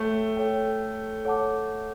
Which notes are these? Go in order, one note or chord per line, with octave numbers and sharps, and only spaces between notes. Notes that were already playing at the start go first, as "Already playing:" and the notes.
Already playing: A3 A4 C#5 G5
A4 C#5 G5
A4 C#5 F#5 A5 D6